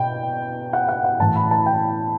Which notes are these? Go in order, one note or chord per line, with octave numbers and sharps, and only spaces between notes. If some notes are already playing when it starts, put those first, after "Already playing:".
Already playing: B2 G5
F#5
F#5
F#5
A2 E3 A5
B5
A5
G5